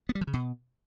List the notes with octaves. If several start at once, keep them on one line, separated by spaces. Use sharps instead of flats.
B3
G3
F3
C#3
B2